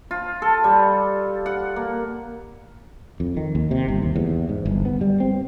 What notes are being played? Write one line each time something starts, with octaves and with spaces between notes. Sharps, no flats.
F4
A4
G3
F#5
A#3
F2
D#3
D#2
C3
G1
D#2
E2
G#2
G1
B3
G3
C4